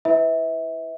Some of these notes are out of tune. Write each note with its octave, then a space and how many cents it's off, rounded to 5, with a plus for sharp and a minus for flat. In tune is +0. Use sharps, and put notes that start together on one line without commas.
E4 +0 B4 +20 E5 -25